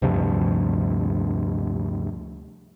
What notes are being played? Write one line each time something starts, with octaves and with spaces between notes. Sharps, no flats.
D2 G2 C3 F3